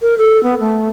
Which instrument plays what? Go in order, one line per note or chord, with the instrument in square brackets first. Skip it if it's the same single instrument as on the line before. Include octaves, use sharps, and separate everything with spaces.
[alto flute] A#4
A4
B3
A3